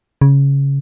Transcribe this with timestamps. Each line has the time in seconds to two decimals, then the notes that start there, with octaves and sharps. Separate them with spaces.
0.22 C#3